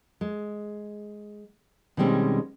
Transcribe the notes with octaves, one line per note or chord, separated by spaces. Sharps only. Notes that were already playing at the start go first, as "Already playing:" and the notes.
G#3
B2 D#3 G3 G#3 C4 C#4